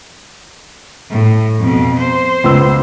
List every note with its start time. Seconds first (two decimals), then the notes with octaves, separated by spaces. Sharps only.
1.10 A2
1.59 F2 B2
1.98 C5
2.44 C#2 B3 E6